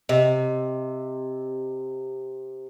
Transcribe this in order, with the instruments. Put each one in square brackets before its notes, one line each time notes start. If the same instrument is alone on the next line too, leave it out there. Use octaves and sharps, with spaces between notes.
[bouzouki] C3 [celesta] D#5